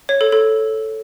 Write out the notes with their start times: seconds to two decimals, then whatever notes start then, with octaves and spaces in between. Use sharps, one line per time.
0.09 C#5
0.21 A4
0.32 A4